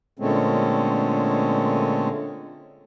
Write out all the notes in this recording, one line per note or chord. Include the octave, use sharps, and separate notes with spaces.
A#2 D3 G#3 A3 C4 C#4